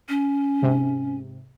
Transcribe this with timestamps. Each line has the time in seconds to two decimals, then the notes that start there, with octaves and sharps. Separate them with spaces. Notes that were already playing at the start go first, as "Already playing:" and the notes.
0.09 C#4
0.62 G#2 C3